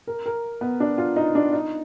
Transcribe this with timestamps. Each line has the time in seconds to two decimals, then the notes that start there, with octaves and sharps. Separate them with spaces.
0.07 A#4
0.26 A#4
0.61 B3
0.80 D4
0.98 F4
1.16 D#4
1.35 D4
1.53 D#4